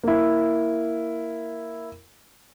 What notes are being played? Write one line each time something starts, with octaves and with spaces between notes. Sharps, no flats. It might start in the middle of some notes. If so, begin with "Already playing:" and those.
A#3 E4